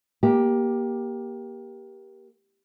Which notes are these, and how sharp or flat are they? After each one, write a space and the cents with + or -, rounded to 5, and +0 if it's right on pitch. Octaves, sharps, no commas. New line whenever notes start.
A#3 +20 G4 +0